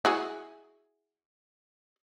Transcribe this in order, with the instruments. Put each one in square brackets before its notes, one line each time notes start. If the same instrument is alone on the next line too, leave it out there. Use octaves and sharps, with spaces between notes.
[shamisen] E4 F#4 G#4